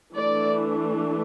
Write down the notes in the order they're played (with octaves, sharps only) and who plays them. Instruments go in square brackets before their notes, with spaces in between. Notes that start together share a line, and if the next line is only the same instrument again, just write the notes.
[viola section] E3 A3 D4 D5